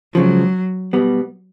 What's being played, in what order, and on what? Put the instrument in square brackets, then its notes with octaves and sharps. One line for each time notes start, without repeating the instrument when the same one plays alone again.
[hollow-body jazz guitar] C#2 C#3 F3 [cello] F#3
[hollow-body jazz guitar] B2 G3 B3